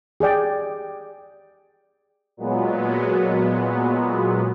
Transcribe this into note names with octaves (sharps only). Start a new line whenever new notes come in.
G4 G#4 D5 G5
A#2 F#3 G#3 B3